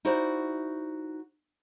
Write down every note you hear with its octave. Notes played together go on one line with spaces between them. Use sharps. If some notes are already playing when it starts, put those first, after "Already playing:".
D#4 E4 F#4 C5 D5